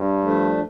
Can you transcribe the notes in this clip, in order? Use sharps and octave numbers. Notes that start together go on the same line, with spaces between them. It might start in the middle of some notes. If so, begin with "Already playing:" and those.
Already playing: G2
F3 A3 D4